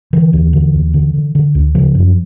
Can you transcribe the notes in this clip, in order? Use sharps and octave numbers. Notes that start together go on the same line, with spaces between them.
D3 E3
D#2
D3
D#2
D3
D3
D3
D2
C#3 F3
F#2